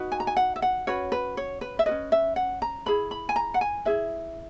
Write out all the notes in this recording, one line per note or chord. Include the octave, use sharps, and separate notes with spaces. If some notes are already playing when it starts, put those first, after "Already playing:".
Already playing: D#4 F#4 B4
G#5
A#5
G#5
F#5
E5
F#5
C#4 F#4 B4 C#5
B4
C#5
B4
E5
F#4 B4 D#5
C#4
E5
F#5
A#5
E4 G#4 B4 B5
B5
G#5
A#5
F#5
G#5
E4 G#4 B4 E5